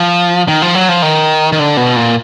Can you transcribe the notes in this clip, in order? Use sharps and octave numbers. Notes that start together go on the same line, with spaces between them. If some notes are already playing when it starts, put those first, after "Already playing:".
Already playing: F3
D#3
F3
F#3
F3
D#3
D#3
D3
B2
A#2